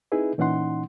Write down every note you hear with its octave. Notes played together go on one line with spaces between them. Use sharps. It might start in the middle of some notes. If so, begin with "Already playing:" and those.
C4 D#4 E4 G#4 B4 E5
A#2 E3 C#4 D#4 F#5 C6